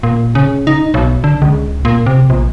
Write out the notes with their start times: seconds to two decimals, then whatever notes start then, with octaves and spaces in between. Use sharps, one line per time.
0.03 A#2
0.35 C#3
0.67 D#4
0.94 B1
1.24 D3
1.42 C#2
1.85 A#2
2.06 C3
2.30 A#1